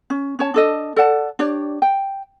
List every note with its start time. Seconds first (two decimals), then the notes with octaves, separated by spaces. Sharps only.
0.10 C#4
0.39 C#4 C#5 A5
0.54 D4 A4 D#5
0.96 A4 D5 F#5 A5
1.39 D4 G4 C#5 D5
1.82 G5